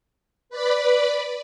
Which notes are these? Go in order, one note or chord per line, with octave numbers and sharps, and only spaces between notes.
B4 D5 B5